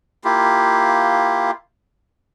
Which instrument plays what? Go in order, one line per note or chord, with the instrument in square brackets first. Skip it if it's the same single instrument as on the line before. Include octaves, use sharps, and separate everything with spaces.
[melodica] A#3 E4 F4 G4